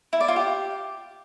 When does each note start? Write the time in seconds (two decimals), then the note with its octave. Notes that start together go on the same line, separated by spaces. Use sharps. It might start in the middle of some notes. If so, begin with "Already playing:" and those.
0.13 E4
0.20 D5
0.28 F4
0.36 G4